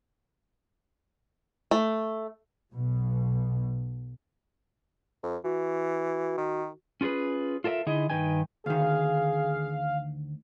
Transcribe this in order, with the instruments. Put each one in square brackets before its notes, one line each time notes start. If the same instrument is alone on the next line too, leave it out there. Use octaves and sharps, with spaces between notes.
[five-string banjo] A3
[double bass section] B1 B2
[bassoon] F2
[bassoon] E3 [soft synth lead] F#4
[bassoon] D#3
[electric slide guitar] C#4 F4 F#4 G#4 B4
F4 A4 A#4 D#5 E5
D3 D#4 E4 G#4 D#5
G2 D#3 D#4 B4 G5 G#5
[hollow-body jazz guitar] D2 D#3 [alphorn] G#4 [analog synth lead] F5